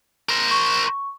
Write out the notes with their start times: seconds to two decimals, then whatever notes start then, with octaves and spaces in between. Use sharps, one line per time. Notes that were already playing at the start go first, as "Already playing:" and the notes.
0.29 A#4 C5
0.51 C#6